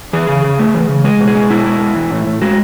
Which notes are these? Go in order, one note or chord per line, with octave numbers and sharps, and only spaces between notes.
E3 G#4
C#3
C#3
A3
E3
C#3
G#3 G#4
B2
G#4
G#3
B2 E4
G#3
B2
E3
A2
A2
G#3 F#4